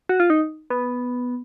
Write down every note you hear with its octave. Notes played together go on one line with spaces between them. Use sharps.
F#4
F4
D#4
B3